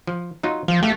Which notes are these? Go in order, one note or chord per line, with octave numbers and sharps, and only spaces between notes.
F3
F#3 D#4 F4
F3 F5
A3 G4 F5